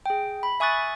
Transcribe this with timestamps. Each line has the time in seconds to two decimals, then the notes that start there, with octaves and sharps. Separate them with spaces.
0.06 G#4 G5
0.43 B5
0.60 E5 G#5 C#6 D#6 F#6 A6